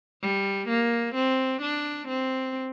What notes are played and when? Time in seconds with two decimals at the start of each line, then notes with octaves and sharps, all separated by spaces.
0.22 G3
0.69 A#3
1.15 C4
1.62 D4
2.08 C4